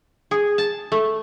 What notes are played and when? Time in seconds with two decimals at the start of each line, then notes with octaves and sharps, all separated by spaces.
0.31 G#4
0.58 A5
0.92 A3